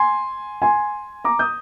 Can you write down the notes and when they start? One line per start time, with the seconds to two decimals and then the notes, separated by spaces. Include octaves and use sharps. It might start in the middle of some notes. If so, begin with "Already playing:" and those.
Already playing: G#5 C6
0.62 G#5 C6
1.24 A#5 D6
1.39 D#6 G6